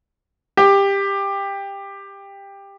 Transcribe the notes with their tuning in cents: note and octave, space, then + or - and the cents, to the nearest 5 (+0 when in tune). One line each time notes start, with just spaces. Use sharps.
G4 +15